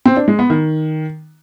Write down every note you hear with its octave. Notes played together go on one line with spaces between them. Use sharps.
C4
D4
G#3
B3
D#3